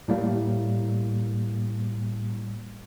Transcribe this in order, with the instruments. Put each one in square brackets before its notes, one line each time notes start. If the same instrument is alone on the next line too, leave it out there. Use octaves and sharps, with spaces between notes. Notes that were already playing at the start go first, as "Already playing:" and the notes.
[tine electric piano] A2 G3 A#3